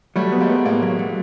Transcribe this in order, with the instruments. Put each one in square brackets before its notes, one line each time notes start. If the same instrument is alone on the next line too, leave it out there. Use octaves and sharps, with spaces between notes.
[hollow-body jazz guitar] F#3 [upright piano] G3 A3
[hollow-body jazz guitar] B3
[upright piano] G#3 A#3
[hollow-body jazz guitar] B3
[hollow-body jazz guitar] A2 [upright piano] G#3 A#3
[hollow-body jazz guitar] F#3
F#3